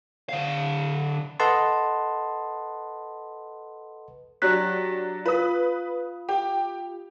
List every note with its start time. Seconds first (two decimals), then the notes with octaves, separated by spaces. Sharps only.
0.29 D3 F5
1.40 A4 B4 D#5 F#5 A5 C6
4.42 F#3 D4 G4 F#6 B6
5.26 F4 B4 D#6
6.29 G4